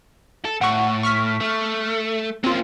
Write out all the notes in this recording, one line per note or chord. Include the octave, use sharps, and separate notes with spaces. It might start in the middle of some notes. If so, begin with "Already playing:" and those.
A4
A2 F#5 C#6
C#6 F6 B6
A3
A#3 C4 C#4 F4